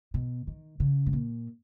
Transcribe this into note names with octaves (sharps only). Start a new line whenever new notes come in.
B2
D#3
C#3
G#2
A#2